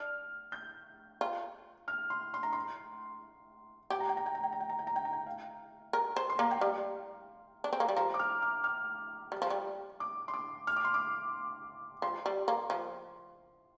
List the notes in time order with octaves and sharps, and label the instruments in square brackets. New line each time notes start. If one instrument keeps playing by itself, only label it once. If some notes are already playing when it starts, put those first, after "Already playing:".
Already playing: [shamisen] D4 [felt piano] F6
[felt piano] G6
[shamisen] F4
[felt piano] F6
C6
C6
A#5
C6
[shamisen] G4 [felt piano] G5
[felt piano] A#5
G5
A#5
G5
A#5
G5
A#5
G5
A#5
G5
A#5
G5
A#5
G5
F5
[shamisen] A#4
C5
[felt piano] C6
[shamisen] A#3 [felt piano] A#5
[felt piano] G5
[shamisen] G3 [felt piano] F5
[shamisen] D4
C4
A#3
G3
[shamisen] F3 [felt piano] A#5
[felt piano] D6
F6
F6
F6
[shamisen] G3
F3
G3
[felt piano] D6
C6
D6
F6
D6
C6
D6
[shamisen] F3 [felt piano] C6
[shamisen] G3
A#3
F3